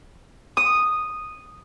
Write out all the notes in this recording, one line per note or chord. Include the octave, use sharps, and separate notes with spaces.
D#6